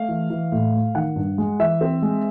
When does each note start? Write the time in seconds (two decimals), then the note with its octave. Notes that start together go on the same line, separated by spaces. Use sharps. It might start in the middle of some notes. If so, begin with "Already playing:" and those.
Already playing: A3 F5
0.09 E3
0.30 E3
0.52 A2
0.74 A3
0.95 D#3 F#5
1.16 G2
1.38 G#3
1.59 E3 E5
1.81 C4
2.02 G#3